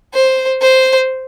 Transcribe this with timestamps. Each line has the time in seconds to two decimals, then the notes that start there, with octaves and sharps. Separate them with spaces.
0.14 C5
0.62 C5